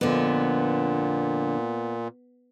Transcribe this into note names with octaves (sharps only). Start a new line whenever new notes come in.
F2 A#2 D3 B3